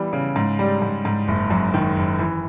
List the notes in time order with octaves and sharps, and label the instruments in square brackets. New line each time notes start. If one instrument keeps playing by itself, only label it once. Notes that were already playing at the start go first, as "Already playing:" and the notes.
Already playing: [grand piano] E3 G3 B3
C#3
G#2
G3
G#2
G#2
F#1
F#2
D#3
F#1
E3